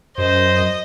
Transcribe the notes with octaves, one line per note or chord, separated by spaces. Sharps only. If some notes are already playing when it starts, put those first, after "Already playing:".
F#2 C5 D#5